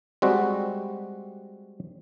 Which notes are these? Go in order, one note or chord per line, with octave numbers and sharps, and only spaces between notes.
G3 G#3 C4 F#4